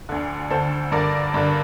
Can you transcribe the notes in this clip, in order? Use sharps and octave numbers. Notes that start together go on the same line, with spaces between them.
D2 D3
D2 D3 A4 C5
G2 D3 A#4 D5
G2 D3